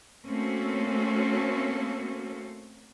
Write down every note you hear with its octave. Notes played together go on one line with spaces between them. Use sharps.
A3 A#3 C4 C#4 F#4 A4